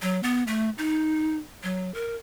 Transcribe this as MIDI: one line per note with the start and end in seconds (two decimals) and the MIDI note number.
0.02 0.20 54
0.23 0.43 59
0.47 0.70 57
0.78 1.37 63
1.63 1.93 54
1.94 2.15 70